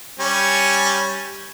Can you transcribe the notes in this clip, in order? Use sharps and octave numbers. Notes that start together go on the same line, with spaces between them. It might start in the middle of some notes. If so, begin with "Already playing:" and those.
G3 C#4 G#5